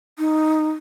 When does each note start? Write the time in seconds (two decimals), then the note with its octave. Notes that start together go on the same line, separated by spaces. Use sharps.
0.18 D#4